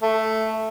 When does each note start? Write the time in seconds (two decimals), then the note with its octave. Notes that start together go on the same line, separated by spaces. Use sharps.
0.03 A3